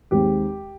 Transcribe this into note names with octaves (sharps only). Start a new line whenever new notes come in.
D#2 D#3 G#3 C4 G4